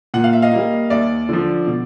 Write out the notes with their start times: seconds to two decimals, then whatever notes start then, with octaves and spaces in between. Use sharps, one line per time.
0.14 A#2 F#5
0.24 F5
0.33 E5
0.42 D#5 F5
0.52 G3 A#3
0.90 D#2 D5 E5
1.29 D3 F3
1.67 B2